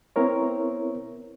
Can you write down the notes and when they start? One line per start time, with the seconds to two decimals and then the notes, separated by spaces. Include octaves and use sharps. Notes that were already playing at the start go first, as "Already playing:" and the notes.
0.16 B3 C4 E4 A#4 C#5